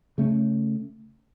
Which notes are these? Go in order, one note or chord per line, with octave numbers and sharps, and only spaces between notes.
C#3 A3 C#4